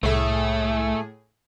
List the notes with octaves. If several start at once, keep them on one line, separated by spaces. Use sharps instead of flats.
C2 A2 A3 G#4 E5